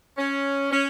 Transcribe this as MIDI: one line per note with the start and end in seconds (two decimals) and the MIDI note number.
0.16 0.65 61
0.70 0.86 61